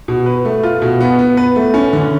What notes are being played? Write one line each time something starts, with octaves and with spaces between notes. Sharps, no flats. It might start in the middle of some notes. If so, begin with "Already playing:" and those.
B2
B4
A3
F4
B2
B3
B3
B4
A3
C#4
D3